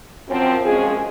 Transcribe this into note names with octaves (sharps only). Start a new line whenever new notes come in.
F#2 F3 C4
F#2 F3 G#3 C#4 G#4